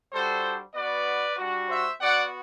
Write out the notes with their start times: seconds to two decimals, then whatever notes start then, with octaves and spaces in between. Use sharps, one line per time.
0.12 G3 D4 F#4 A4 C5
0.74 B3 F#4 B4 D5
1.37 G3 D4 F#4
1.68 C5 E5
2.00 B3 F#4 D5 F#5